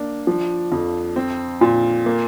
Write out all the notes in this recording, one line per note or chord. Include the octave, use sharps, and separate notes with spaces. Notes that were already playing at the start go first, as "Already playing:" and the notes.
Already playing: A#3 D4
F3
F2
C4
A#2
A#3